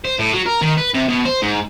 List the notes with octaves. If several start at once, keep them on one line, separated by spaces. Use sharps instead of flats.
C5
A2
F#3
A#4
D#3
B4
C3
B2
C5
G#2